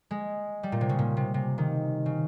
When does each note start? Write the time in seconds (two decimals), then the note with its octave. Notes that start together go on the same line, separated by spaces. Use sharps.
0.11 G#3
0.63 G3
0.72 A#2
0.81 C3
0.89 C#3
0.99 A#2
1.17 C3
1.34 C3
1.58 D#3
2.06 C#3